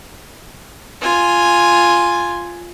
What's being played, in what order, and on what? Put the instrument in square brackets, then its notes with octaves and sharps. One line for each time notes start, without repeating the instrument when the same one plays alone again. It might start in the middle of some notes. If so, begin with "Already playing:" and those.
[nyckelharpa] F4 G#5